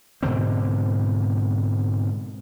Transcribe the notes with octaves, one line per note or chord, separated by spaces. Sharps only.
G#2 B2 D3 C4